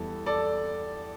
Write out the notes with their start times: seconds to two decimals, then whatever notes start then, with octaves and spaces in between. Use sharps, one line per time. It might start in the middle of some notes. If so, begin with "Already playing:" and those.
Already playing: E2 E3 G3 A4
0.26 A4 D5